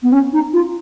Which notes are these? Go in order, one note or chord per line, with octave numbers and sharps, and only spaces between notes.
B3
C#4
D#4
F4